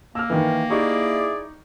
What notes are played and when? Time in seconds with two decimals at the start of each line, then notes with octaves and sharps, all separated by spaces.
0.15 A#3 E6 F6
0.30 D#3 E3
0.70 D#4 E4 G4 G#4 D5 C#6